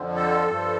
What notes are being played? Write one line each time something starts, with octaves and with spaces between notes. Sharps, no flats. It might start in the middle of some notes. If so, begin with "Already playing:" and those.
Already playing: F2 D3 F3
A4
G2 F3